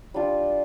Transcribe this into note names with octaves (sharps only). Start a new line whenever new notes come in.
G3 D4 F4